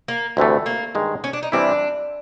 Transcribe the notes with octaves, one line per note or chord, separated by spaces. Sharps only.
A#3
D2 C3 E3 A3
A#3
G2 D#3 G#3
C#4
D4
D#4
C3 E3 G3 C4 D4 E4